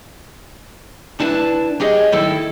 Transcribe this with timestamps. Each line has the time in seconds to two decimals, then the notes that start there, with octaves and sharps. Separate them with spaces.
1.19 D2 D4 E4 B4 A5
1.80 G4 G#4 C#5 D#5
2.12 D#3 E4 A4